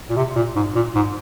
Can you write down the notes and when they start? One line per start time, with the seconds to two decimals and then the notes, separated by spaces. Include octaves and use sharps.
0.10 A#2
0.16 C3
0.36 A#2
0.56 G#2
0.75 A#2
0.95 G#2